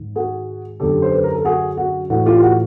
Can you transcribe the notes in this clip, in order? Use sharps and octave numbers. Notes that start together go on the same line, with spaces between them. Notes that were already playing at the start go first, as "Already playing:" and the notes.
Already playing: G#2 D#3
F#4 G#4
F#2 D3 G4 A4
C5
B4
A#4
A4
F#4 G#4
F#4
A2 E3 F#4
F4 G4
F#4